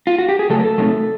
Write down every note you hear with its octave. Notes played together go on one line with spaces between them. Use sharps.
F4
F#4
G4
G#4
C#3 F#3 A3 A4
A#4
A4
C3 D#3 F#3 A3